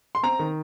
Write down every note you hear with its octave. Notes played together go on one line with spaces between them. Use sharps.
C6
C4 A#5
D#3